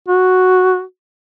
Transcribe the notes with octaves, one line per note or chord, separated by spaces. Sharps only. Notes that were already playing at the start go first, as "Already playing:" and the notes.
F#4